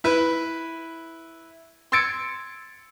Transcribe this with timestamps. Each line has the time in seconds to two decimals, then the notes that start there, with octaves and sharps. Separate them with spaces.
0.04 E4 B4
1.92 C6 E6 G#6 A6 C#7 D7